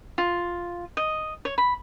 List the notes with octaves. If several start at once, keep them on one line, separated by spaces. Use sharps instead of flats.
F4
D#5
C#5
B5